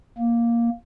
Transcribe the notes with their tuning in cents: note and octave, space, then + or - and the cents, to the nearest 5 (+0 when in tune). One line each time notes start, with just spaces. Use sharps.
A#3 +5